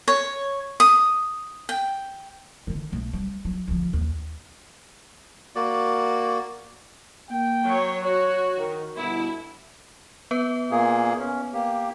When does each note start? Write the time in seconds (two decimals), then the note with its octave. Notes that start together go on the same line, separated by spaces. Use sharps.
0.08 C#5
0.80 D#6
1.69 G5
2.67 D3 D#3
2.92 B1 A3
3.13 G3
3.45 F#3
3.68 D2 F3
3.93 D#2
5.55 A#3 F#4 D5
7.30 A#3 G5
7.65 F#3 C#5
8.04 F#4 C#5
8.58 D#3
8.96 G1 B2 E4
10.31 B3 B4
10.71 A#2 A#3 G#4
11.18 C#4
11.53 A#3 G4